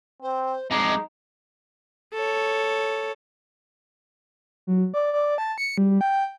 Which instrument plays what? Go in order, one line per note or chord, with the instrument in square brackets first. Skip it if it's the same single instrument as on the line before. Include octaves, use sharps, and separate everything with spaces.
[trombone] C4 [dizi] C5
[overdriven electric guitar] F2 G#3 [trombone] D#4 [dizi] D6
[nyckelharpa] A4 C#5
[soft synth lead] F#3
D5
D5
A5
C#7
G3
G5